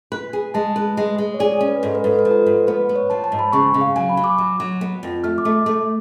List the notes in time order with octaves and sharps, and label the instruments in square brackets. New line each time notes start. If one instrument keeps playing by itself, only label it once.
[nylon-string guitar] B4
G#4
[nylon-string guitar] G#3 [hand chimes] A5
[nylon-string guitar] B4
G#3
G#3
[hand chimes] C#5
[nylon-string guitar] G#4 [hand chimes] D5
[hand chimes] C#5
[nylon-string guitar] C#4
[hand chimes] B4
[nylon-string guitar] G#2 [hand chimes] A4
[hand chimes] B4
[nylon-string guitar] G#2 [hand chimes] A4
[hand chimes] B4
[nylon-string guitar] F3
[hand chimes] A4
[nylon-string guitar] G#2
[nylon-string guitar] B3 [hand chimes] B4
[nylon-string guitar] B3
[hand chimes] C#5
[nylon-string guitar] F3 [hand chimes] A5
[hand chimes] A5
[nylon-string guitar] G#2
[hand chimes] B5
[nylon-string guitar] C#3 [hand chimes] C#6
[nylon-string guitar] C#3
[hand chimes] F5
[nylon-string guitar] F#3 [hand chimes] G#5
[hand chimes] B5
[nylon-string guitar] F#3
[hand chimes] D6
[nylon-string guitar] F#3
F#3
B3
F2
[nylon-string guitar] A3 [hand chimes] F6
[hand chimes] D6
[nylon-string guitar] A3
[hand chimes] D6
[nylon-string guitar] A3